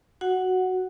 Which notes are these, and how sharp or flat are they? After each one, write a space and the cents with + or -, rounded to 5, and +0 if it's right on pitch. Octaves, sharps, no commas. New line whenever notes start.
F#4 +0 F#5 +0